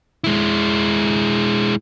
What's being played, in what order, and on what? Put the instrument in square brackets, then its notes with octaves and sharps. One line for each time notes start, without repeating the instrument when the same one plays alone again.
[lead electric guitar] G#3 E4